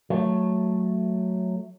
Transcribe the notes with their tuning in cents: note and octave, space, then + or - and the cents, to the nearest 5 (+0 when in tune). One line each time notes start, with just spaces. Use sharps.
F#3 +0 A3 +0